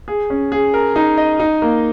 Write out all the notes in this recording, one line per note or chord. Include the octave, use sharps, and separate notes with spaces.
G#4
C#4
G#4
A#4
D#4
D#5
D#4
A#3